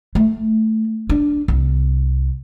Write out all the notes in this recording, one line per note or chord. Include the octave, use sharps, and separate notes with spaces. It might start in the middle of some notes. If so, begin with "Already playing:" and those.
A3
D4
C2